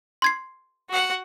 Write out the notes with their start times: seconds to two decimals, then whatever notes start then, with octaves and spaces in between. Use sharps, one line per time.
0.22 C6 G#6 C7
0.90 F#4 F#5